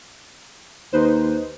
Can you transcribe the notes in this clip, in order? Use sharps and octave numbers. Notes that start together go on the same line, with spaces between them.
D#2 D#4 B4 C5